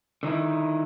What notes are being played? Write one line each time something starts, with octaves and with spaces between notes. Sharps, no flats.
D3 D#3 D#4 E4